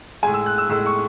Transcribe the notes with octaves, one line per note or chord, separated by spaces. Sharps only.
A2 G#3 G#5
E6
F#6
E6
A2 G#3 E6
C#6